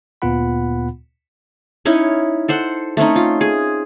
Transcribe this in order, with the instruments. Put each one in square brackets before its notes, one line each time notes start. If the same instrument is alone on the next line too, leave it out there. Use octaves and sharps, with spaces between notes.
[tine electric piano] D2 A#2 B3 F4 F#5 B5
[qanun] C#4 D#4 E4 C#5
A4 C5 F#5
A3 C4 C#4 D#4
F4
G#4